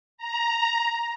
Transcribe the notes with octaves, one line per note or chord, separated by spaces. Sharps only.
A#5